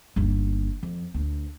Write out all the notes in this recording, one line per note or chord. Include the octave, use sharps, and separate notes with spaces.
G1 D#2
F2
D2